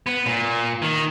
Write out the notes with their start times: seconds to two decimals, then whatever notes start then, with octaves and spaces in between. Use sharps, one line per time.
0.07 B3
0.26 A#2
0.82 D#3